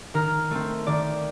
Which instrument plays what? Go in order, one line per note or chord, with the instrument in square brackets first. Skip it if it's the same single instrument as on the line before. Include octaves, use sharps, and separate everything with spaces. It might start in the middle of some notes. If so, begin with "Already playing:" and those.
[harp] D#3 A#4
A3 C4
D#3 D5